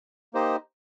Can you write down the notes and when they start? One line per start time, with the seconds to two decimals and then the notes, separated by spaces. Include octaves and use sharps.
0.34 A#3 D#4 G4 C5 D#5